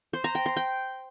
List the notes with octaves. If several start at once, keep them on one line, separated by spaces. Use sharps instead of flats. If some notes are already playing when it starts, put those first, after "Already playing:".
C5
A#5
G5
C6
G5